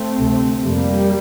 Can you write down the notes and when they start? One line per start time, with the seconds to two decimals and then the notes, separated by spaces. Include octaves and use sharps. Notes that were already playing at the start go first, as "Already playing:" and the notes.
Already playing: A3 C4
0.18 D2 C3
0.64 F2 C3 G3 A#3